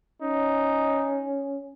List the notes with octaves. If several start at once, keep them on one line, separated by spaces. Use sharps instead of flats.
C#4 D#4